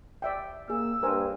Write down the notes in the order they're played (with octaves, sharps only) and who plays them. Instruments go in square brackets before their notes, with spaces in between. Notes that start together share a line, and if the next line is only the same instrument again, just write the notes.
[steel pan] D5 E5 G5
[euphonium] A#3 [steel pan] G#4 [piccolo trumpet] E6
[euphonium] G2 [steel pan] A#4 C5 G#5